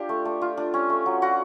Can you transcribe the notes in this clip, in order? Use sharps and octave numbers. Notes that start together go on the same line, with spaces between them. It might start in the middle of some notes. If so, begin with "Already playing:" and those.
Already playing: D4 F4 G4
A3
A3
F4
D4
C#4
A3
F#3
F4 F#4